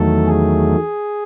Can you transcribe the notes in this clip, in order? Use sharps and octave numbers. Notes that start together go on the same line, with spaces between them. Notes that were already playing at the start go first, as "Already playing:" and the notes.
Already playing: E2 D#3 F#3 A3 A4
G#4